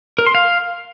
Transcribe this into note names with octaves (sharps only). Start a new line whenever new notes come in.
A#4
C6
F5